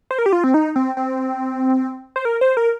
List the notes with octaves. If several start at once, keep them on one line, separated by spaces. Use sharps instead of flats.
C5
A#4
G4
F4
C4
D#4
C4
C4
C5
A#4
C5
A#4